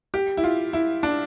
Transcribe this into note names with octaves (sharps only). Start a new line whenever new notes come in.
G4
E4
F4
E4
D4